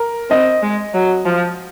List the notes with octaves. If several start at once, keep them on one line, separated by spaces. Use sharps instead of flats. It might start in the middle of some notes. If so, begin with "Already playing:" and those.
Already playing: A#4
C4 D#5
G#3
F#3
F3